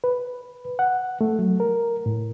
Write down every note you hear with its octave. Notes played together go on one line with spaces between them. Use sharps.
B4
F#5
A3
F#3
A#4
A2